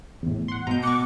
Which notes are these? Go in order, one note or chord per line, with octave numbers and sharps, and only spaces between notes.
E2 A2
F#5 C6
B2 A#5 G6
F#5 C#6 D6